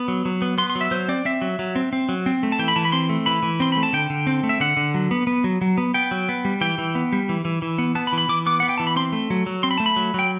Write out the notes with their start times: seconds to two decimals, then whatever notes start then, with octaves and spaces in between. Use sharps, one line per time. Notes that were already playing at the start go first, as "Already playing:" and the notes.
Already playing: B3
0.08 F#3
0.25 F#3
0.42 B3
0.58 B3 C6
0.70 C6
0.75 F#3
0.81 E5
0.91 F#3 C5
1.08 C4 D5
1.25 C4 E5
1.42 F#3
1.59 F#3
1.76 C4
1.93 C4
2.09 F#3
2.26 C4
2.43 A3
2.52 A5
2.59 E3 G5
2.68 B5
2.76 E3 A5
2.85 B5
2.92 C4 C6
3.09 A3
3.26 E3 B5
3.43 E3
3.60 C4 C6
3.72 A3 B5
3.83 A5
3.93 D3 G5
4.10 D3
4.27 C4
4.43 A3
4.49 E5
4.60 D3 F#5
4.77 D3
4.94 F#3
5.11 B3
5.27 B3
5.44 F#3
5.61 F#3
5.78 B3
5.94 B3 G5
6.11 F#3
6.29 B3
6.45 G3
6.61 E3 G5
6.78 E3
6.95 B3
7.12 G3
7.29 E3
7.45 E3
7.62 E3
7.78 B3
7.95 B3 A5
8.07 B5
8.13 E3
8.18 B5
8.29 E3 D6
8.46 B3 D6
8.60 B3 F#5
8.69 G5
8.78 E3 A5
8.87 B5
8.96 C4 C6
9.13 A3
9.30 F#3
9.46 F#3
9.63 C4 C6
9.71 B5
9.78 A3 A5
9.86 B5
9.96 F#3
10.14 F#3 G5